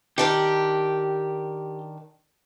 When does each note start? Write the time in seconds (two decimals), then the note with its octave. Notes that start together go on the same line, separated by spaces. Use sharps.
0.18 D#3 D4 G4 A#4